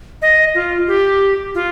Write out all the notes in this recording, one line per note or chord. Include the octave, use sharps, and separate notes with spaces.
D#5
F4
G4
F4